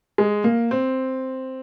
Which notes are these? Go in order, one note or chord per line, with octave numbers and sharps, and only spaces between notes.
G#3
A#3
C4